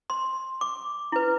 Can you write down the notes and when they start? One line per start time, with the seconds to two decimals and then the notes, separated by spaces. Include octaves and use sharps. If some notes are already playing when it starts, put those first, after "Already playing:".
0.10 C6
0.61 D6
1.12 E4 B4